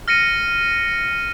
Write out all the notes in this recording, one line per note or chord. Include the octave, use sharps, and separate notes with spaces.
F6 A#6 C#7 D#7